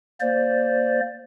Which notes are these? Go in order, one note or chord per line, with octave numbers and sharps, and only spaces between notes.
A#3 C5 D5